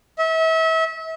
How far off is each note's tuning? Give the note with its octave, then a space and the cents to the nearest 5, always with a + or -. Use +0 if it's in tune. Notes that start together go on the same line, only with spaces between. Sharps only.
E5 -35